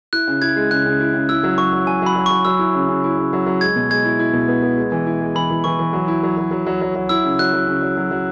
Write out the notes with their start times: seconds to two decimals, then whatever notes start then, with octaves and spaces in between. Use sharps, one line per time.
0.13 E4 F#6
0.27 C#3
0.42 E4 G#6
0.56 G#3
0.71 C#3 F#6
0.86 C#3
1.00 E4
1.14 C#3
1.29 E4 E6
1.43 F#3
1.57 F#3 C#6
1.73 F#3
1.87 F#3 G#5
2.02 F#3 B5
2.15 F#3
2.26 F#3 C#6
2.45 F#3 E6
2.59 E4
2.75 C#3
2.88 C#3
3.04 E4
3.18 C#3
3.33 F#3
3.46 F#3
3.61 G#3 G#6
3.76 B2
3.90 G#3 G#6
4.05 E4
4.19 E4
4.33 B2
4.48 B3
4.62 B3
4.78 G#3
4.92 E3
5.06 E4
5.21 G#3
5.35 E3 B5
5.50 E3
5.64 E3 C#6
5.79 E3
5.93 F#3
6.08 E4
6.23 F#3
6.37 F#3
6.51 F#3
6.66 F#3
6.81 F#3
6.95 F#3
7.09 E4 E6
7.24 C#3
7.39 F#3 F#6
7.53 F#3
7.67 C#3
7.82 F#3
7.97 F#3
8.11 F#3